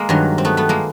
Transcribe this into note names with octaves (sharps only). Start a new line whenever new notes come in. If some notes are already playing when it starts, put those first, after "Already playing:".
Already playing: G#3 A#3
G2 D#3 F#3
C4
A3 B3
A3 B3
G#3 A#3